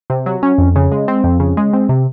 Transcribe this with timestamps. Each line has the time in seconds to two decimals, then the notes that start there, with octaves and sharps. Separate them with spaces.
0.10 C3
0.26 F#3
0.43 C#4
0.58 F2
0.76 C#3
0.92 G#3
1.08 C4
1.24 F2
1.40 C#3
1.57 G#3
1.73 C4
1.89 C3